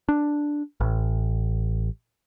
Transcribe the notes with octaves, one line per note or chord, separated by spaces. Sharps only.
D4
A1